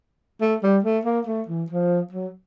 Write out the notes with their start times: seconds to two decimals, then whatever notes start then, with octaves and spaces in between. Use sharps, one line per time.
0.41 A3
0.63 G3
0.84 A3
1.05 A#3
1.27 A3
1.48 E3
1.70 F3
2.12 F#3